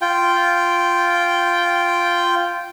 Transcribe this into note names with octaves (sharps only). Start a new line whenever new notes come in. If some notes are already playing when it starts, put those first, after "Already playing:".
F4 G5